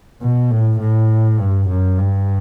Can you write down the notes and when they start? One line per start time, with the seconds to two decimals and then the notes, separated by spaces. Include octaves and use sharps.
0.22 B2
0.51 A2
0.80 A2
1.39 G2
1.68 F#2
1.98 G2